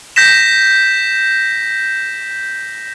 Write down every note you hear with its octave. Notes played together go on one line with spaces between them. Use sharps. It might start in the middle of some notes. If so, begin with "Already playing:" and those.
G6 A#6 B6 E7